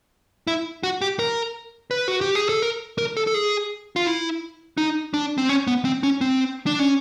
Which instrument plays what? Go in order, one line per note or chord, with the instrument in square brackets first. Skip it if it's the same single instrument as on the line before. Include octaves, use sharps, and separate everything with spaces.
[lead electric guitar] E4
F#4
G4
A#4
B4
F#4
G4
G#4
A4
A#4
A#4
A4
A4
G#4
F4
E4
D#4
D4
C4
C#4
B3
C4
C#4
C4
D4
C#4